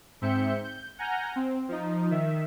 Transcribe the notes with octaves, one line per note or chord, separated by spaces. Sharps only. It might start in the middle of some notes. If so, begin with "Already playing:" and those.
G#2 C4 E5 G6 C#7
G6
F#5 G#5 A#5 F6 G6 A#6
C4
F3 D#4
D#3 E5